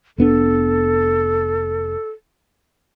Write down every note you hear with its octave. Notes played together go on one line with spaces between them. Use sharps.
F1 B3 D4 A4